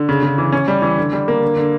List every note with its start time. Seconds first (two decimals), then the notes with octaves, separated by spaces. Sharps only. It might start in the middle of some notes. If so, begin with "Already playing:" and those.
Already playing: D3
0.09 C#3
0.22 C#3
0.38 E3
0.52 C#4
0.68 G3
0.82 E3
0.97 D3
1.13 G3
1.28 A#3
1.42 D3
1.57 D3